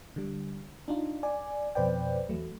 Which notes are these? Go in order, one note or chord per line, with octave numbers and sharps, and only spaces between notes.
D3 G3
D4 D#4 F4
D5 G#5
F2 B2 B4 C5 D5 G5
E2 F#3 A3